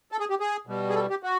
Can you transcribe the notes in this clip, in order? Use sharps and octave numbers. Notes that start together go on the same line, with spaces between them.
A4
G#4
G4
G#4
B2 G3
G#4
A4
G4
F#4